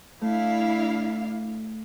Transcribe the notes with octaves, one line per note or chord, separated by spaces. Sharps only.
A3 D4 E4 F5